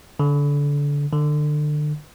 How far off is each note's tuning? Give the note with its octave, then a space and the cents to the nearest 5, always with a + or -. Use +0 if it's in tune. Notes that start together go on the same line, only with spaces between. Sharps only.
D3 -25
D3 +30